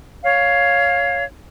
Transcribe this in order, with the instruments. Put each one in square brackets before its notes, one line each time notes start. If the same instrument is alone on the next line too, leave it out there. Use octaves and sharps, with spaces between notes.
[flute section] C#5 F5